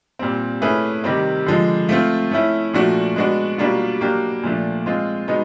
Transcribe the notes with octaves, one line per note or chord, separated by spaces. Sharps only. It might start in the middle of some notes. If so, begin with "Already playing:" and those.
A#2 G3 C4
A3 C#4 E4 G#4 B4
C3 D#3 G3 C4
D3 F3 G#3
A3 C4 F4
A3 C#4 E4
A#2 F3 A3 D4 F#4
G#3 B3 D4 F#4
B2 G3 A#3 D4 F4
F#3 A#3 D4 G4
A#2 F3 A3 D4
G#3 C4 F4
B2 G#3 B3 D#4